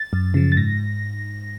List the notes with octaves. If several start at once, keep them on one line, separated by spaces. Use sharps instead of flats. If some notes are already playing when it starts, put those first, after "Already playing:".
Already playing: A6
F#2
C#3 F3
A6
G#2 A#6